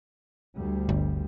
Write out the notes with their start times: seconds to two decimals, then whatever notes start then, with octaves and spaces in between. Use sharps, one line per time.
0.55 D2 G3
0.89 G1